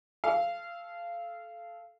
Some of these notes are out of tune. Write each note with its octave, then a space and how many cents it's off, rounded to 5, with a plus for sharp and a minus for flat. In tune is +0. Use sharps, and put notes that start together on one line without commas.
A4 -20 F5 -20